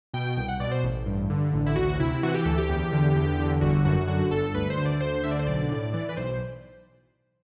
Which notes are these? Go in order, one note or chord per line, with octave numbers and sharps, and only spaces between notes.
B2 G5
C2 G5
F#5
B2 D5
C5
A1
G2
D3
A1
E4
D2 F#4
C3 E4
E3 F#4
G4
D2 A4
G4
E2
D3
E2
D3
G1 F#4
F#2 F#4
D3 F#4
G1 A4
D2 B4
C5
D3
D5
D2 C5
D3 E5
D5
C5
B1 D5
A2
E3 D5
B4
B1 C5